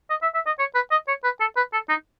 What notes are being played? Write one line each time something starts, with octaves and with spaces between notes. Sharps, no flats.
D#5
E5
E5
D#5
C#5
B4
D#5
C#5
B4
A4
B4
A4
D#4